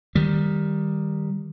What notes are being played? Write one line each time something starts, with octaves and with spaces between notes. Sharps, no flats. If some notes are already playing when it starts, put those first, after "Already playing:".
D#3 G3